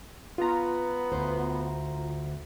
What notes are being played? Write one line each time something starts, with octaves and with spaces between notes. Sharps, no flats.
B3 F4 A#5
D2 C5